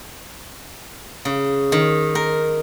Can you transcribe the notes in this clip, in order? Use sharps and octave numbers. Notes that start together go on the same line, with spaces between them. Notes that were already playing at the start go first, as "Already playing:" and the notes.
C#3
D#3
A#4